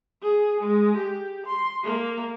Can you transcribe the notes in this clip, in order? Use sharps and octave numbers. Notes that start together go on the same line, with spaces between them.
G#4
G#3
G4
C6
A#3